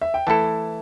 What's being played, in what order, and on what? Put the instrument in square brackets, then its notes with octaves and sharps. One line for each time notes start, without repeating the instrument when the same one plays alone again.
[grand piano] E5
G5
[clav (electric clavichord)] E3 A3 E4 A4 [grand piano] A5